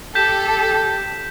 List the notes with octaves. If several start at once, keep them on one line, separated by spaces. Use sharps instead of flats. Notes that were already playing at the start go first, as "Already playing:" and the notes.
G4 A4 G6 B6 E7